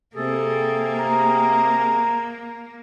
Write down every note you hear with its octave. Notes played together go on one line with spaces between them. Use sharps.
C3 A#3 G#4 A4
A#5